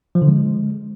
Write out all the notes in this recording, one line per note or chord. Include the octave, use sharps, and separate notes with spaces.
F3
D3
G#3